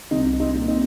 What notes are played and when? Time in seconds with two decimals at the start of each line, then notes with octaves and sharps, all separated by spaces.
0.11 C2 C4 D#4
0.40 C4 D#4
0.54 A#2
0.68 C4 D#4